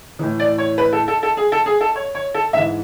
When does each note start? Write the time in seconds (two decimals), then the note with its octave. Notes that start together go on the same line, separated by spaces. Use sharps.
0.19 A2 E3
0.40 D5
0.58 C#5
0.78 B4
0.93 A4
1.08 A4
1.23 A4
1.37 G#4
1.52 A4
1.66 G#4
1.81 A4
1.96 C#5
2.15 C#5
2.34 A4
2.53 G#2 E3 E5